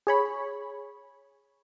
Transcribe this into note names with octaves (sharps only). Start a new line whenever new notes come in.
G#4 C#5 B5